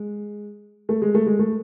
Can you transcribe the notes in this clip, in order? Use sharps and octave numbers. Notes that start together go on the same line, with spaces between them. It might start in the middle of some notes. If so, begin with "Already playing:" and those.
Already playing: G#3
A3
G#3
A3
G#3
A3